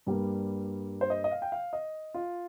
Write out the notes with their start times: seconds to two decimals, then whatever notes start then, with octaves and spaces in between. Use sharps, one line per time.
0.07 G2 G3 A#3
1.01 C5
1.10 D#5
1.24 D#5
1.31 F5
1.42 G5
1.52 F5
1.73 D#5
2.14 F4